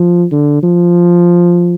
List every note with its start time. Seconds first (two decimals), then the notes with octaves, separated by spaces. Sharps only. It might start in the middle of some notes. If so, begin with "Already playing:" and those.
Already playing: F3
0.32 D3
0.63 F3